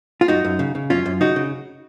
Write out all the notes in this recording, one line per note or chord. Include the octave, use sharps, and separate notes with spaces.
F4
F#2 D#4 F#4
F#2
C#3
C#3
F#2 C#4 F4
F#2
C#3 D#4 F#4
C#3